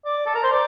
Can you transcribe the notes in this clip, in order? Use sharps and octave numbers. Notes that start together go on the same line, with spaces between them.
D5
A4
A#4
C5
D5